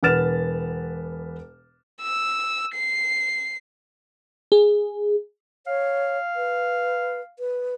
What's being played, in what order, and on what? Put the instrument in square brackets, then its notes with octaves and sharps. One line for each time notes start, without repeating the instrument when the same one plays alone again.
[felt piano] E1 B4 F#5 F6 A6 E7
[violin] E6
C7
[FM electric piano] G#4
[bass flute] C#5 [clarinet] F5
[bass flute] B4
B4